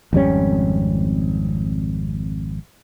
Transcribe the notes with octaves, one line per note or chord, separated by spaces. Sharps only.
G#1 F2 G3 C#4